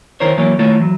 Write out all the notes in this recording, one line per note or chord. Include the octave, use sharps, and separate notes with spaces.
D#3 E4 A#4 C5 C#5
E3 F#3 A#3 E4 C#5
D#3 A3 E4 F4 A4 C#5
E3 F#3